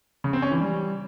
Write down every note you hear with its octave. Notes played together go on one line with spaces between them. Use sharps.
C#3
C4
C#4
E3
G3